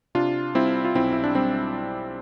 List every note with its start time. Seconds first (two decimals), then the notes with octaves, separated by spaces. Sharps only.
0.15 C3 D4 F4
0.55 G3 C4 E4
0.85 F4
0.95 B1 C4 E4
1.13 E4
1.24 D4
1.35 G3 C4